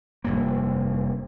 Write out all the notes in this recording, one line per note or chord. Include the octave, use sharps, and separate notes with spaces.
F1 G2 A#3